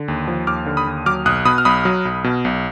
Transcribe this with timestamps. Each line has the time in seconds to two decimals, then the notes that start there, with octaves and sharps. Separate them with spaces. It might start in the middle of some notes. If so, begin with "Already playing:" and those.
Already playing: D3
0.08 D#2
0.28 F3
0.47 D#2 D6 F6
0.66 D3
0.77 B5 D#6
0.87 D#2
1.06 F#3 D6 F6
1.26 B1 D#6 F#6
1.45 B2 B5 D#6
1.58 F6
1.65 B1 B5 D#6
1.85 F#3
2.05 B1
2.24 B2
2.45 B1